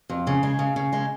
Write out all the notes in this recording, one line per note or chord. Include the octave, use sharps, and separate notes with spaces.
F2
C#3
G#3
C#3
C#3
G#3